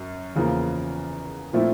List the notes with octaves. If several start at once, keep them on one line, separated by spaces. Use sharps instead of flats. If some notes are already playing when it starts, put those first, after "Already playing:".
Already playing: F#2
E2 C#3 F3 A#3
A#2 F3 A3 C4 E4